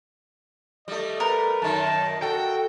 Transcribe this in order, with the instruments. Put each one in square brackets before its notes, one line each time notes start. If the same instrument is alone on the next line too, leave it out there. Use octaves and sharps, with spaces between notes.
[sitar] G3 A3 [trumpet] D#5
[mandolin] A#4 [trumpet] B4
[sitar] F#2 D#3 [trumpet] A5
[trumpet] F#4 [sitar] A4 [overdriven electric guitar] G5